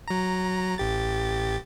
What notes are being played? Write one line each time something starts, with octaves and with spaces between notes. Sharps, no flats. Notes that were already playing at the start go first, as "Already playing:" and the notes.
F#3 A#5
A1 G4 A6